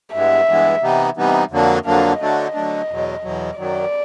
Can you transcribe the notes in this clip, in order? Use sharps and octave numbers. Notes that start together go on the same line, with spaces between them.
G2 E3 G#3 B3 E5
G2 E3 G#3 B3
C3 E3 G3 B3 D#4
C3 E3 G3 B3 D#4
F2 D3 F#3 A#3 D4
F2 D3 F#3 A#3 D4 F5
D3 F#3 A3 D4 D#5
D3 F#3 A3 D4
E2 B2 F#3
E2 B2 F#3
F#2 D#3 F#3 D5